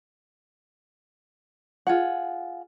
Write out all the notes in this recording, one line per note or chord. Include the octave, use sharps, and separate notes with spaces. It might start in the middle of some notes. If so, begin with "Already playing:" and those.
F4 G#4 F#5